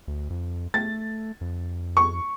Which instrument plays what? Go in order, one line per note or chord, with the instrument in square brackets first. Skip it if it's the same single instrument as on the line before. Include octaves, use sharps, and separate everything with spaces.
[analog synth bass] D2
F2
[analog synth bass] A3 [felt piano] A6
[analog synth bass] F2
[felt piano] C#6